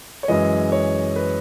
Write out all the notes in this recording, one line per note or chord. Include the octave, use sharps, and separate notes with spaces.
C#5
F#2 E3 G#3 D#5
C#5
B4